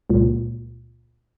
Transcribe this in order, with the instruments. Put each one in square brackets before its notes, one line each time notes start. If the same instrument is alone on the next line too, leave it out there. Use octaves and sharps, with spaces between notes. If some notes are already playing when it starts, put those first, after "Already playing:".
[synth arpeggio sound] C#2 A#2